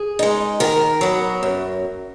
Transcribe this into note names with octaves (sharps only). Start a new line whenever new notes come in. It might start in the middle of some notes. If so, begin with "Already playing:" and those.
Already playing: G#4
G#3 D#4
D#3 A#4
F#3 B3
F#2